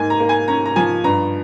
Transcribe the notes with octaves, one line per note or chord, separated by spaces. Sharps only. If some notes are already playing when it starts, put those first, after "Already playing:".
Already playing: G#2 A#3 G#5
A#5
A#3
G#5
C#4 A#5
A#5
F3 G#5
G2 A#5